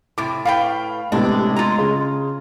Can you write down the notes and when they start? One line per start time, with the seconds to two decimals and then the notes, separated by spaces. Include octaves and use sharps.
0.18 A2 C3 D6
0.45 A2 B4 F5 G5
1.12 A2 C3 G#3 B3 D4
1.56 F4 A#5
1.78 C#3